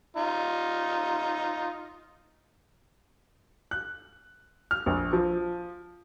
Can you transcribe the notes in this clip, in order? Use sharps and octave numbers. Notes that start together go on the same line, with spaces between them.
D#4 F4
F#6
F6
A#1
F3